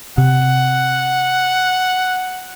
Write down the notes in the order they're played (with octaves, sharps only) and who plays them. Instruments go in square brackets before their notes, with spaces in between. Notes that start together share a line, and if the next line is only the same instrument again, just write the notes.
[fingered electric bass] C3 [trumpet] F#5